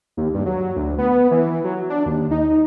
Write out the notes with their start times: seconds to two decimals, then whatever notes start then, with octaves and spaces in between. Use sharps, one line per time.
0.17 D#2
0.34 G2
0.46 F#3
0.76 D2
0.98 B3
1.31 E3
1.64 F#3
1.90 D4
2.06 D#2
2.31 D#4